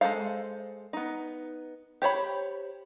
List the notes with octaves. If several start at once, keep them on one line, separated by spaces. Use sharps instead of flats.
G#3 C4 A4 C5 F5
B3 D#4
G4 C5 C#5 B5